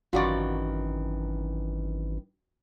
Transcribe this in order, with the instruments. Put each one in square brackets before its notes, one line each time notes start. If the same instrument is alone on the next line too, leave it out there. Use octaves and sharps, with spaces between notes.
[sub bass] G#1 [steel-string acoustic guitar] F#2 D#3 E3 [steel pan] F4 F#4 D5